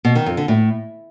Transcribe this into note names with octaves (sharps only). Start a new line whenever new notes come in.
B2
D#3
F2
D3
A2